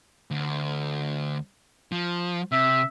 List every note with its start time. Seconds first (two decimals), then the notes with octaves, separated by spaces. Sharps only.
0.31 D2
1.92 F3
2.52 C3 E5